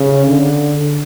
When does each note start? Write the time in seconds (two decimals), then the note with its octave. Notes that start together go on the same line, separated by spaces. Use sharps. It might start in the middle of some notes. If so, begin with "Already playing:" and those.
Already playing: C#3
0.27 D3